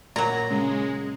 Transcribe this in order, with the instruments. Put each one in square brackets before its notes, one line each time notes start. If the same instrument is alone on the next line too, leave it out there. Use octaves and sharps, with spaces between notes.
[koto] A#2 F#3 [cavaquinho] A#5
[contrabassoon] C#3 [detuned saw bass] G#3